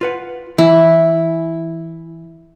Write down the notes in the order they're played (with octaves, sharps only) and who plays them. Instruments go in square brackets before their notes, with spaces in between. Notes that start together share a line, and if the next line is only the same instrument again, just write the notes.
[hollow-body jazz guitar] F4 B4 F#5
[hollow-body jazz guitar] E3 [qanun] E4